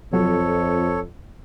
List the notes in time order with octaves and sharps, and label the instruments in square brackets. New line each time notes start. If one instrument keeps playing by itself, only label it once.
[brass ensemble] F2 [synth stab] C3 F#3 [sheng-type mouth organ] A4 C#5